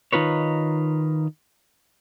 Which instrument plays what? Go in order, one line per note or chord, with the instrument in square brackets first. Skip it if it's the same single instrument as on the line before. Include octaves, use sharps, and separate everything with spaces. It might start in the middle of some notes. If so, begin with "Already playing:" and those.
[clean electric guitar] D#3 D#4 F4 B4 C#5